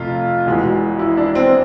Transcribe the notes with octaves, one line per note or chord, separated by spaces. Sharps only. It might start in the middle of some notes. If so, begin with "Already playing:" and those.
Already playing: F2 C3 A3 F4
E1 E2 B2 G#3
E4
D4
C4
C4